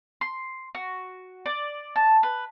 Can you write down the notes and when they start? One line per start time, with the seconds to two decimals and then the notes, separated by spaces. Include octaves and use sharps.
0.21 C6
0.75 F#4
1.46 D5
1.96 A5
2.23 B4